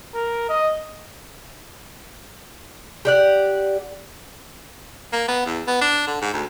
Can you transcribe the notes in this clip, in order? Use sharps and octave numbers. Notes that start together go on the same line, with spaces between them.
A#4
D#5
G4 D5 F#5
A#3
B3
E2
B3
D4
D3
G#2
D2